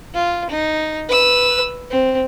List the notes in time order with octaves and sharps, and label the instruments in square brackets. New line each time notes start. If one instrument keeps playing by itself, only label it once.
[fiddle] F4
D#4
B4 E6
C4